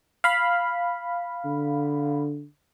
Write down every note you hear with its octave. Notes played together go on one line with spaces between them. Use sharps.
F5 B5
D3